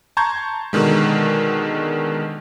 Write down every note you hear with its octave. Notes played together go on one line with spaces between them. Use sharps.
A5 A#5 C6 C#6 G6 G#6
B2 D3 D#3 G#3